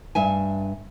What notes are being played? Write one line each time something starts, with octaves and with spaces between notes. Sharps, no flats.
G2 E5 G#5